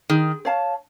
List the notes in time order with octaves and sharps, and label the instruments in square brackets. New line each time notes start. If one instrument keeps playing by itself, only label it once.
[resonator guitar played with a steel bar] D#3 [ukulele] G#4
[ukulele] C#5 F5 A5